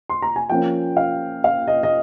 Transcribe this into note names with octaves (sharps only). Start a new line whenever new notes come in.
C6
A#5
G#5
F3 A#3 C#4 G5
F5
F5
D#5
D#5